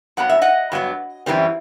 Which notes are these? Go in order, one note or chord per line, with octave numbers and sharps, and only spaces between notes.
G2 F#3 B3 F#5
E5
D#5 F#5
G2 F#3 B3
F#2 E3 G3 C4